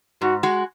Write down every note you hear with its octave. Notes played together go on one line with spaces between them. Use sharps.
G#2 F#4
G#3 F#4